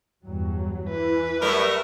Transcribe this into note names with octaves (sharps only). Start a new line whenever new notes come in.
E2 G2 F#3
E3 B4
F#3 G3 A3 A#4 E5 C#6